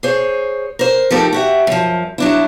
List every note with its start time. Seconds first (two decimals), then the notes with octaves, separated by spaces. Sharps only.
0.03 G#4 C5 C#5
0.79 A#4 C5
1.11 F3 A3 D#4 G4 A4 A#4
1.33 F#4 G4 E5
1.67 F#2 F3
2.18 F#3 D4 E4